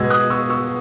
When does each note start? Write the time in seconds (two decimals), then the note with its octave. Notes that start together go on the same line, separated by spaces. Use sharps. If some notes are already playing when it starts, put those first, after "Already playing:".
Already playing: B2 G#3 B3 E6 G#6
0.10 D#6 F#6
0.30 C#6 E6
0.50 C#6 E6